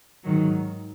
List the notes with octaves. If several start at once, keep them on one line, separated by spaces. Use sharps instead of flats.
G#2 D#3 F#3